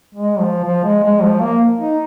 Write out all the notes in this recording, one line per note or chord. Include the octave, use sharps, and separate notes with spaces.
G#3
F3
F3
G#3
G#3
F3
A#3
D#4